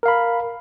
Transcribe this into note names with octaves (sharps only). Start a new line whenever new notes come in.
A#4 F5 B5